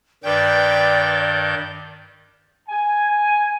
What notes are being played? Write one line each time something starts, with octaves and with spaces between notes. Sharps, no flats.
G2 D#3 B4 D5 G5 G6
G#5